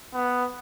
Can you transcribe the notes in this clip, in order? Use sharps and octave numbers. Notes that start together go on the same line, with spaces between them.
B3